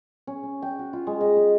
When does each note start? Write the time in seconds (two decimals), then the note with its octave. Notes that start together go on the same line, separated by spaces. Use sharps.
0.27 C#4
0.43 C#4
0.62 G5
0.79 F#4
0.93 F4
1.07 G#3
1.21 D#5
1.37 D#5